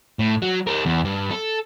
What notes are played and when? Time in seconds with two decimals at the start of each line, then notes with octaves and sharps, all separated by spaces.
0.19 A2
0.42 F#3
0.67 G4 A#4
0.86 E2
1.05 G2
1.30 A4